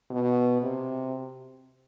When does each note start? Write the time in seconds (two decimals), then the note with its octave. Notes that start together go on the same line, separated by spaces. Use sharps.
0.11 B2
0.62 C3